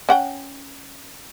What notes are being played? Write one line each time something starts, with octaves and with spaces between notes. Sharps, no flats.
C#4 F#5 G5